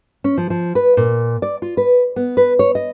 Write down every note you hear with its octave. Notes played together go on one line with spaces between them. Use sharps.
C#4
F3
F3
B4
A#2
D5
F4
B4
B3
B4
C#5
D#5